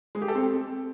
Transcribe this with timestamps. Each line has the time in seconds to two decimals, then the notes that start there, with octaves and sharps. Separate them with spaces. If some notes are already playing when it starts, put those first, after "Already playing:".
0.15 G#3
0.22 G4
0.28 A4
0.35 C4